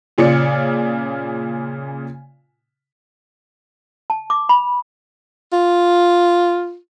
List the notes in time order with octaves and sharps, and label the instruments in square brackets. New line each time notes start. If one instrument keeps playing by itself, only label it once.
[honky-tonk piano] A#2 C#3 F4 D5 C#7
[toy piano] A5
D6
B5
[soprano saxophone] F4